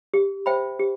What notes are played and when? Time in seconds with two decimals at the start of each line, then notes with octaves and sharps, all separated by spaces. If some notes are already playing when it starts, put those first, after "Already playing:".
0.14 G4
0.46 C5 E5 G5 B5
0.79 G4